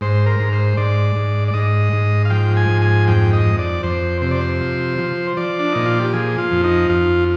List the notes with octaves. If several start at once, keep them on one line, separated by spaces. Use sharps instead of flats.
G#2 C5
A#4
G#2
C5
G#2 D5
G#2
D5
G#2 D#5
G#2
F5
F3 G5
G#5
G#2
G#5
F2 G5
D#5
F2
D5
F2 C5
C3 C5
D5
C5
F3
F3
F3 D5
D4
A#2 D#4
F4
G4
F3 G#4
F4
F2
D#4
F2 F4